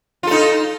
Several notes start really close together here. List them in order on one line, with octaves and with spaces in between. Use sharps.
F4 A4 D#4